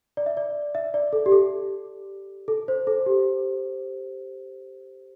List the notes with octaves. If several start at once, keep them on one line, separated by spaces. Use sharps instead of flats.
D5
E5
D5
E5
D5
A4
G4
A4
A4
C5
A4
G4